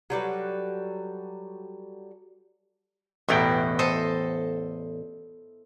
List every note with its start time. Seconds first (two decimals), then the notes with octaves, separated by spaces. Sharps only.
0.10 F#3 G3 A4 B4
3.28 A1 E2 B2 E4 G5 A#5
3.79 A4 C5 D#5